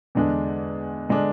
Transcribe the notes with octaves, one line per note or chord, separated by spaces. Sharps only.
E2 D3 G#3 D4
D3 G#3 D4